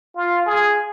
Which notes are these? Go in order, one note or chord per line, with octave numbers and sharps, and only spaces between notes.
F4
G#4